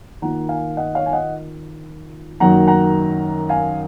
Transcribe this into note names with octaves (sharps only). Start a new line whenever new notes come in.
D#3 A#3 F4 F#5 A#5
F5 G#5
D#5 F#5
C#5 F5
G#5
D#5 F#5
F#2 D#3 F#3 A#3 F#5 A#5
F#5 A#5
F5 G#5